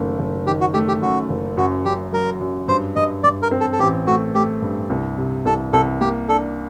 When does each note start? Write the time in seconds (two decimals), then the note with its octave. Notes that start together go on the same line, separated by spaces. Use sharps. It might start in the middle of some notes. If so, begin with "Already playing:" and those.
Already playing: F#1 D#3 A3
0.19 F#1
0.47 D#3 G4
0.61 F#4
0.74 A3 G4
0.88 G4
1.02 F#2 F#4
1.29 F#1
1.57 F#2 F#4
1.85 F#2 G4
2.13 F#3 A#4
2.41 F#2
2.68 G2 C5
2.96 G2 D#5
3.23 G2 D5
3.43 A#4
3.51 C4
3.60 A4
3.73 A4
3.79 A1 G4
4.07 A3 F#4
4.35 A3 G4
4.62 G2
4.90 C2
5.18 C3
5.45 C2 A4
5.73 C2 A4
6.01 A#3 G4
6.29 D4 A4